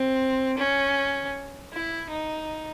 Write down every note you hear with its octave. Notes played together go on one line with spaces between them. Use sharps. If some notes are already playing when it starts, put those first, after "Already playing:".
Already playing: C4
C#4
E4
D#4